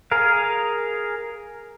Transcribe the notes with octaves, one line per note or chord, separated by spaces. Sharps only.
G#4 A#4 F5